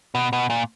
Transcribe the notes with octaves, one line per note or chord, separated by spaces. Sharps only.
B2
B2
A#2